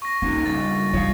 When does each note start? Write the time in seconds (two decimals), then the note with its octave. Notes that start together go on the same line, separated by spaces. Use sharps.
0.02 C#6 A#6
0.22 A#3 C#4 D#4 F#4
0.46 C#3 G3 D4 A6
0.93 G3 F4 C#5 F5